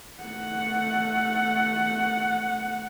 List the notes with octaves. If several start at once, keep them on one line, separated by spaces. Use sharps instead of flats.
A3 F#5